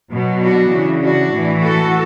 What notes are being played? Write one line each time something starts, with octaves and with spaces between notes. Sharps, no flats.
B2 F#3
D4 F#4
C#3 E3
D4 F#4
A2 E3
F#4 A4